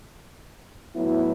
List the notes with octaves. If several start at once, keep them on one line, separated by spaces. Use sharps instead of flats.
A2 F#3 B3 E4